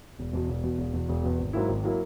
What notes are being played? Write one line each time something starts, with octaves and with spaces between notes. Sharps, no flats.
E1
E2 B2
E1
E2 B2
E1
E2 B2
E1
E2 B2
G#1
G#2 F#3 A#3 E4
G#1
F#3 A#3 E4